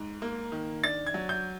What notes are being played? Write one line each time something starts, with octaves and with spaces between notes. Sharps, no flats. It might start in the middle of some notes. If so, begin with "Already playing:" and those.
Already playing: G#2
A#3
D#3
D4 A6
G#6
F#3
G6